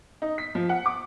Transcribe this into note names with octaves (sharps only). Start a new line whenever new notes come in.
D#4
B6
F3
F#5
D6